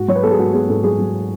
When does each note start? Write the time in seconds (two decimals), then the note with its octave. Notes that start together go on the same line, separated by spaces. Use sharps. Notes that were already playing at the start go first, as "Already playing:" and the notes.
Already playing: G#2 F#4
0.08 F#3 C#5
0.15 B4
0.23 B3 A4
0.31 G#4
0.38 G#2 F#4
0.53 B3 G#4
0.69 G#2 A4
0.83 F#3 G#4
0.98 F#3